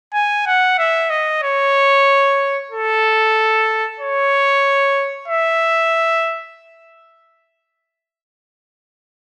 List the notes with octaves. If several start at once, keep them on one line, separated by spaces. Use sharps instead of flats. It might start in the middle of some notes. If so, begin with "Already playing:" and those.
G#5
F#5
E5
D#5
C#5
A4
C#5
E5